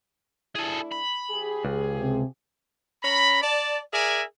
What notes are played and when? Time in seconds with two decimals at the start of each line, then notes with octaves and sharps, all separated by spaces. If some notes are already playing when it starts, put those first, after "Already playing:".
0.55 A3 D4 E4 G#4 A4
0.92 B5
1.31 F3 G4 G#4
1.65 C#2
1.97 C3
3.03 C#4 A#5 B5
3.42 D5 A5
3.93 G#4 A#4 D5 E5 G#5